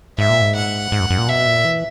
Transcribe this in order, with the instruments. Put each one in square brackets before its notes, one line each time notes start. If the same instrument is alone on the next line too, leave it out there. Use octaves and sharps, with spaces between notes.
[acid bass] G#2 [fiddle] E5
[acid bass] A#2
G#2
[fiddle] F#5
[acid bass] G#2
F#2
F#2
A#2
[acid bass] B2 [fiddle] E5
[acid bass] A#2
E3